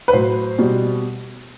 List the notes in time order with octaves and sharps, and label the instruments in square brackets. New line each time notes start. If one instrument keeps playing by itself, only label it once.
[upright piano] B4
A2 F#3 C5
B2 G3